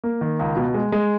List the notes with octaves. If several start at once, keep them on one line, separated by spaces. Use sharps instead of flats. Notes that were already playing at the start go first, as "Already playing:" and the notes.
A#3
D#3
C#2
B2
G#3
G#3